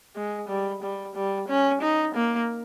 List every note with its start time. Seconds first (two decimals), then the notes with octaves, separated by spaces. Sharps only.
0.16 G#3
0.48 G3
0.82 G3
1.15 G3
1.48 C#4
1.82 D#4
2.15 A#3